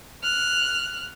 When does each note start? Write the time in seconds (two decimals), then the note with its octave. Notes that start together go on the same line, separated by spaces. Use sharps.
0.23 F6 F#6